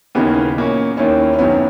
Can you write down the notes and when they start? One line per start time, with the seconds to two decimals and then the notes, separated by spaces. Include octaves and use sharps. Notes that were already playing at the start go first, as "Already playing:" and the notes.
0.15 D#2 C#3 E3 A#3 B3 D#4
0.56 A#2 A#3 C#4
0.97 D#2 D#3 A#3 C#4 E4
1.33 C#4
1.38 F#2 D#3 F#3 A#3 B3 E4
1.54 B3